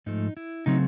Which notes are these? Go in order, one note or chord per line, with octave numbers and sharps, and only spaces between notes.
G#2 F3 A3 D#4
E4
C#3 F#3 A3 C4 D#4